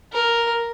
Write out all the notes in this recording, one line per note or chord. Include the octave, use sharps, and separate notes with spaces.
A#4